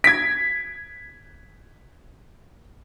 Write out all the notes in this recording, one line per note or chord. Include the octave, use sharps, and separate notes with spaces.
G#6 B6 D7